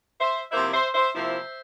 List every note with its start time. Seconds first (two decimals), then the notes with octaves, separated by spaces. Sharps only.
0.20 C5 E5
0.51 C3 F3 A#3 E4 C5 E5
0.73 C5 E5
0.94 C5 E5
1.15 C3 F3 A#3 E4 C5 E5